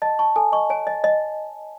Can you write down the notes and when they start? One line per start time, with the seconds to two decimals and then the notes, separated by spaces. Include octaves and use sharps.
0.02 D#5 A5
0.19 A5 C#6
0.36 A4 G#5
0.52 D#5 C#6
0.70 C#5 G#5
0.87 D#5
1.04 D#5